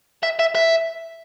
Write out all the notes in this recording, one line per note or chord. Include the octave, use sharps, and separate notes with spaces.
E5
E5
E5